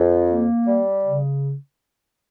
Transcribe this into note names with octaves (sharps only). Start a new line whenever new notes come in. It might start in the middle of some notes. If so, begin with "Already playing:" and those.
Already playing: F2
A#3
G3
C#3